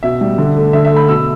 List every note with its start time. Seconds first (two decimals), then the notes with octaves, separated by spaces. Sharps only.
0.03 B2 E5
0.21 G3
0.38 D3
0.56 A3
0.73 D3 E5
0.85 E5
0.91 A3
0.96 B5
1.08 B2 E6